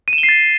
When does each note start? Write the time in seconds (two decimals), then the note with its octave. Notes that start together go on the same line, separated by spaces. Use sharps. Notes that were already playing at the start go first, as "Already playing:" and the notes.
0.08 D#7
0.13 E7
0.18 G7
0.23 C7
0.29 A6